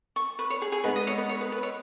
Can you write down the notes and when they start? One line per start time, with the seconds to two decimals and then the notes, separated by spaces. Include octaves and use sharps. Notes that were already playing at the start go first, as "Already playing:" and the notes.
0.16 C#6
0.39 B4
0.50 C#5
0.62 G#4
0.72 G#4
0.84 G#3 B3 D#4 B4
0.96 D#5
1.07 C#5
1.18 B4
1.29 C#5
1.41 B4
1.52 B4
1.63 C#5